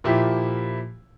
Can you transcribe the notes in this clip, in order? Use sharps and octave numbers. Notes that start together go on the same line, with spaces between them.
A#2 F3 E4 G4